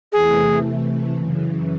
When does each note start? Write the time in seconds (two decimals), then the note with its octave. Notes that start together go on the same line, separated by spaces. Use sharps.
0.12 E2 C3 E3 A3 G#4
0.63 C3 E3 A3
1.14 F#2 C#3 E3